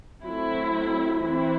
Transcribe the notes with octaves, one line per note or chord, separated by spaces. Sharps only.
F#3 A3 C4 E4
E3 C4 E4